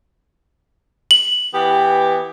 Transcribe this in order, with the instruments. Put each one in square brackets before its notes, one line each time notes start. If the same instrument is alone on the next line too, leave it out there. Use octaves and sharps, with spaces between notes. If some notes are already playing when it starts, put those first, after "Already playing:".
[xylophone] F#7
[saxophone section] E3 B3 G4